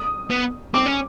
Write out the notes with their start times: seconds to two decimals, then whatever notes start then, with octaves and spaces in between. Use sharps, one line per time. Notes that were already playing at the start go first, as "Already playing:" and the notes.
Already playing: D#6
0.31 B3
0.74 C4 D6
0.86 C#4